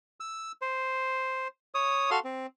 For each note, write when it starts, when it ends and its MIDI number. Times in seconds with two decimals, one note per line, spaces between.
0.20 0.52 88
0.62 1.48 72
1.74 2.10 73
1.74 2.10 87
2.11 2.20 66
2.11 2.20 69
2.11 2.20 77
2.11 2.20 84
2.24 2.46 60